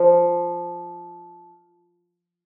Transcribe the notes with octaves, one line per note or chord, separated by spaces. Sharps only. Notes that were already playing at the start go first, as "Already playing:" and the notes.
Already playing: F3